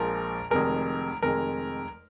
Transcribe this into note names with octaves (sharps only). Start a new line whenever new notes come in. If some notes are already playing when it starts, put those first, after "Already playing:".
Already playing: A#1 A#2 F3 G#3 A#4
F1 F2 D#3 G#3 A#4
F1 F2 D#3 G#3 A#4